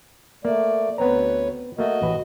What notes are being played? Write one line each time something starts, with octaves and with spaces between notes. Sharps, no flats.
A3 A#3 D5
D2 B3 C4 B4 C#5 A#5
A3 A#3 F#4 D#5
A1 B4